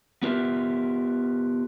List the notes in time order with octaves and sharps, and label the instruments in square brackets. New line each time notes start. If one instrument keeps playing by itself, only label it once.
[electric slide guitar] B3 F4 G4 A#4 E5